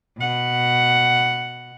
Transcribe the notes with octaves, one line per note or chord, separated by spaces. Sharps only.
B2 F#5